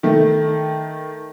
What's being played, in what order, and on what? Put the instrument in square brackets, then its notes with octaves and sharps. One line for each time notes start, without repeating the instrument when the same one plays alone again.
[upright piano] D#3 A3